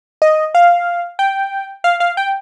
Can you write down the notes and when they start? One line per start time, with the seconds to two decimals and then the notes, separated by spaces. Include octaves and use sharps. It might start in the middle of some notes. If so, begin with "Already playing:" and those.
0.22 D#5
0.55 F5
1.19 G5
1.84 F5
2.00 F5
2.17 G5